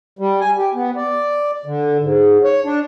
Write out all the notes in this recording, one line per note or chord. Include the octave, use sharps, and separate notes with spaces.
G3
G#5
G4
B3
D5
D3
G#2
C#5
D4